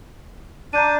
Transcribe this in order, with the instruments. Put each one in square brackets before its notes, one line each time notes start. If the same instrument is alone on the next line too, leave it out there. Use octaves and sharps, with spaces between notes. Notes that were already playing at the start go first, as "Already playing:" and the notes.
[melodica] D4 [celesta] A#5 G6 D#7